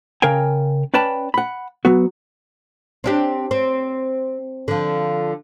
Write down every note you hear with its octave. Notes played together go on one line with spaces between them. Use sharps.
C#3 A#4 F5 G5 G#5
C#4 B4 D5 G5 A5 B5
F#5 B5
F#3 B3 F#4
C4 D4 G4
C4
D3 F3